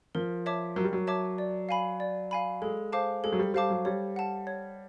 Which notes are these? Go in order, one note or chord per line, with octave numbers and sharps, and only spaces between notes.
F3 A#4
C#5 E5 A5 D6
F#3 A#4
G3
F#3
C#5 E5 A5 D6
D5
F5 G#5 B5
D5
F5 G#5 B5
G#3 A4
C5 F5 A5 D6
G#3 A4
F#3
G3
G3 C5 F5 A5 D6
F#3
G3 C#5
F#5 A5
C#5